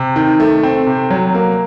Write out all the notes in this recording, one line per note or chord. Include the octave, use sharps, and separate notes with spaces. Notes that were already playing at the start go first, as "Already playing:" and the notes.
Already playing: C3
D#3
A3
C4
C3
F#3
A#3